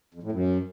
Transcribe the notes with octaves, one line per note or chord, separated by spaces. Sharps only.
F2
A2
F#2